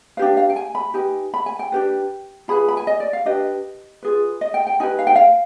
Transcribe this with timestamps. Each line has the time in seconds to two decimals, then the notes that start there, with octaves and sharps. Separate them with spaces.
0.17 D4 G4 B4 F5
0.37 F5
0.50 G5
0.56 G#5
0.75 B5
0.94 D#4 G4 B4 G#5
1.34 B5
1.46 G#5
1.59 G5
1.72 D4 G4 B4
2.48 F4 G#4 B4 B5
2.68 B5
2.77 G#5
2.87 D#5
3.00 D5
3.13 F5
3.25 D4 G4 B4 D#5
4.03 F4 G#4 B4
4.41 D#5
4.54 G5
4.67 G5
4.80 D#4 G4 B4 G#5
4.99 F5
5.07 G5
5.16 F5